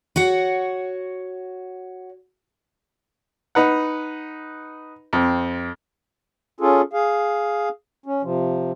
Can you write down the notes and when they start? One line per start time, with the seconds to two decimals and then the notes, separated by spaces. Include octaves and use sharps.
0.16 F#4 C#5 F#5
3.55 D#4 B4 F#5
5.13 F2 C4
6.60 C#4 F4 G#4 A4
6.93 G#4 F5
8.06 C#4
8.23 C3 F3